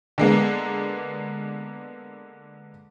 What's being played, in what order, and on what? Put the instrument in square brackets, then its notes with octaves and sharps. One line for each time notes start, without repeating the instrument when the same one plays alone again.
[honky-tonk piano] D3 G#3 A#3 B3